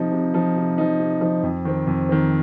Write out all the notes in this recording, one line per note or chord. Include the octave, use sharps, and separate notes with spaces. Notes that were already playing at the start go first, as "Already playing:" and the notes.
Already playing: C3 F3 D#4
C3
F3 D#4
C3
F3 D#4
C3
F3 D#4
F2
D#3 C4
F2
D#3 C4